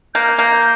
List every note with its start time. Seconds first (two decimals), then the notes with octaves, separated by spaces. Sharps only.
0.14 A#3 G6
0.22 F6
0.30 G6
0.39 A#3